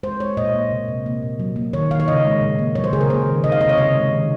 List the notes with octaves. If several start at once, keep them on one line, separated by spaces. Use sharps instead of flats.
G#3 C5
G#3 C#5
A#2 D#5
A#3
C3
C3
A#3
A#2
F#3
A#3
D#3 C#5
D#3 F5
C#5
C#3 D#5
G#3
A#2
A#3
F#3 C#5
C5
C#3 G#4
A#4
A#3 C5
D#3
C3 D#5
F5
C3 D#5
C#5
C#3 D#5
G#3
D#3